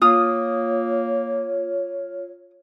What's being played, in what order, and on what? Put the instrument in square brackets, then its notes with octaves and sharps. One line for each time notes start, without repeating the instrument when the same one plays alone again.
[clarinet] A#3 [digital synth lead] F4 [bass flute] C#5 [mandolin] D#6